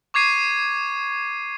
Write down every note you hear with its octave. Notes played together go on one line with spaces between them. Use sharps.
C#6 D6 G#6 C7 D#7